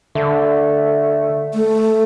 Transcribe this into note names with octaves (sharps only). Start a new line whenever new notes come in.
D3 A3
A3